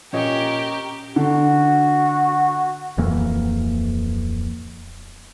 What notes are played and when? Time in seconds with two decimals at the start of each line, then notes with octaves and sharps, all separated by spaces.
0.13 A#2 C#4 F4 G4 A#4 C#5 D#5 C#6
1.16 D3 F#4
2.97 D1 F2 E3 A#3